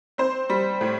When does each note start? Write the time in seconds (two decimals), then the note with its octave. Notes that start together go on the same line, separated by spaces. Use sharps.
0.18 C4 C5
0.50 G3
0.81 A2